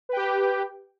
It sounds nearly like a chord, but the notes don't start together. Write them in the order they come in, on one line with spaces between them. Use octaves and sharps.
B4 G5 G4